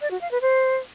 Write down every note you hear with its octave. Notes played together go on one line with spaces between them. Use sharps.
D5
F#4
F5
B4
C5